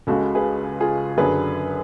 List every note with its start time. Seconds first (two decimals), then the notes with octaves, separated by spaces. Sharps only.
0.07 C#2 C#3 G#3 F#4 A4
0.35 G#4 B4
0.81 F4 G#4
1.18 F#2 D3 F#3 G#4 B4